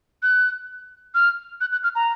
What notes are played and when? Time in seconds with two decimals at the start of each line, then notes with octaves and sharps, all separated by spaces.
0.23 F#6
1.15 F6
1.61 F#6
1.72 F#6
1.83 F6
1.95 A#5